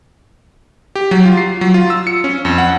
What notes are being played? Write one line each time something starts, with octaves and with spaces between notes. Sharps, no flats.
G4
F#3
F4
C7
F#3
F4
E6
C#7
C#4
F2
F#5